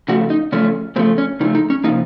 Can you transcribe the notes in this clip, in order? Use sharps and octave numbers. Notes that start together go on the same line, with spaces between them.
C#3 F3 A3 F#4
D#4
C#3 F3 A3 C#4
C#3 F3 A3 C4
C#4
C#3 F3 A3 D#4
D#4
C#4
C3 F3 A#3 D#4